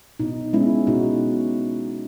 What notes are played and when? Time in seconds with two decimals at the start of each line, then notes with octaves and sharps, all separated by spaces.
0.20 B2 D#4
0.53 G#3 B3 C#4 E4
0.87 B2 D#4 F#4